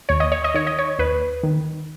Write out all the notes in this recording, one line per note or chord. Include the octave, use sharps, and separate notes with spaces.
D#2 C#5
D#5
C#5
D#5
D#3 C#5
D#5
C#5
D#2 B4
D#3